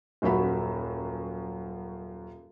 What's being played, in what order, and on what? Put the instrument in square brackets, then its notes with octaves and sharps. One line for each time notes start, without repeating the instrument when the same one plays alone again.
[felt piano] D#1 F#2 F#4 E5 B5